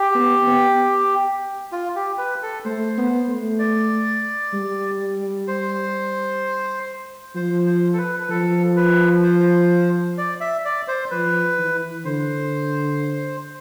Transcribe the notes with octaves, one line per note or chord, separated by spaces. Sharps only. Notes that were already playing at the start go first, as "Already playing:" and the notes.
Already playing: G4
B3
B3
F4
G4
B4
A4
A3 C5
B3
A3
D5
G3
C5
F3 C5
C5
A4
B4
B4
F3 A4
B4
C5
D5
E5
D5
C5
F3 B4
E3
D3 C5